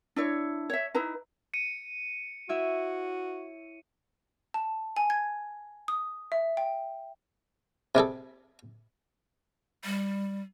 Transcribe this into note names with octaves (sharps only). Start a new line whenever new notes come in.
D4 E4 C#5
C#5 E5
D#4 E4 B4 A#5
C#7 D#7
E4 F#4 C#5 E5
A5
G#5
G#6
D#6
E5
G5
C3 G3 G#4 A4
G3